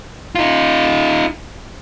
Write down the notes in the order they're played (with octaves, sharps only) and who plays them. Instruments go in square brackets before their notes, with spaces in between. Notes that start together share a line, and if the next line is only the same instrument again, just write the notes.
[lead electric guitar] D#4 F4